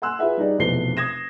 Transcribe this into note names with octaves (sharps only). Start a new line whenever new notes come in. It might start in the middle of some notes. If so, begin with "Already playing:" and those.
F#5 G#5 C6 E6 F#6
F4 G#4 B4 E5 F#5
G3 D#4 G#4 D5
F1 B1 E2 F3 C7 G7
D#6 G#6 A#6 E7